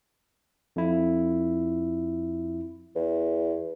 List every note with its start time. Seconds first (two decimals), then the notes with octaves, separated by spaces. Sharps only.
0.76 F2 E4
2.96 E2